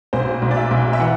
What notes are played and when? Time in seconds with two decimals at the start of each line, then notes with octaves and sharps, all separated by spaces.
0.13 B1 C5
0.42 B1
0.51 D5
0.57 E5
0.71 B1
0.93 E5
1.00 E3 F#5